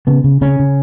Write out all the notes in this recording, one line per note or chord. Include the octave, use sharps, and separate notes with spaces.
C#3 B3
C#3
C#3 C#4
C#3